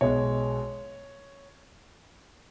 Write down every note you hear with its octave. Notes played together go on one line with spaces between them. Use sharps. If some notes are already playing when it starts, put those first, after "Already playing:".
B1 B2 G#3 C#5